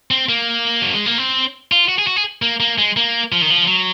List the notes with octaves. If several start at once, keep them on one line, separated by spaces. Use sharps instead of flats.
C4
A#3
F#3
G#3
A#3
C4
F4
F#4
G#4
F#4
G#4
A#3
A#3
G#3
A#3
F3
D#3
F3
F#3